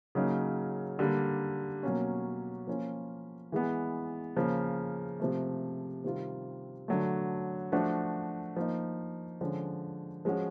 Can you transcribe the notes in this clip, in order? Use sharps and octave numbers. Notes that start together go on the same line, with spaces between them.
C#3 F#3 A#3 D#4
D3 G3 A#3
B2 F#3 A#3 C#4
F3 A#3 C#4 F4
E3 G#3 B3
C#3 F3 A#3
C3 F3 A3
C3 D#3 G3 C4 F4
D3 F#3 A3
F3 A3 D4 F#4
F3 A#3 D#4
D3 F3 G#3 C#4
F3 G#3 C#4 F#4